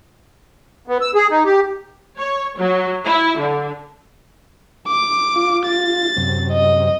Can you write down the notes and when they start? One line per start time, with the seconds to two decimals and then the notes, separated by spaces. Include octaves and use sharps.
0.88 B3
1.01 E6
1.15 G#4
1.31 D#4
1.45 G4
2.18 C#5
2.57 F#3
3.04 E4
3.37 D3
4.88 D6
5.35 F4
5.66 A6
6.16 F#2 C3
6.52 D#5